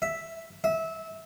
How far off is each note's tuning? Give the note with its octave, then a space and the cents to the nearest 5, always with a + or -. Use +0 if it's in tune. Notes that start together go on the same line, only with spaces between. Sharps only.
E5 +0
E5 -20